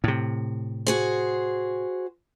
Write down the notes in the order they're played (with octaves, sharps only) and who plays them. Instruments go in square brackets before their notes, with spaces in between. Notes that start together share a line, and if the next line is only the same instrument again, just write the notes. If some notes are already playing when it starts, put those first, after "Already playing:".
[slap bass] A2 C3
[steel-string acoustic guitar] F#4 G#4 C5